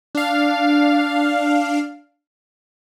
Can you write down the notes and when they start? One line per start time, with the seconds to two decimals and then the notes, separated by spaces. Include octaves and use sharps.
0.15 D4 F5